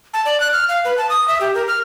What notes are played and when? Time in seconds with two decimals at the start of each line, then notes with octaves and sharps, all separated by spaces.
0.14 A5
0.25 D5
0.40 F#6
0.53 F6
0.69 F5
0.85 B4
0.98 A5
1.10 D#6
1.28 E5
1.41 G4
1.55 A#4
1.68 F6